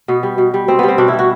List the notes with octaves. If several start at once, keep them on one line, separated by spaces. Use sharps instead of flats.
B2 B3
G3
B2
G3
B2 C4
G3 B3
C4
B2 D4
E4
G3
F#4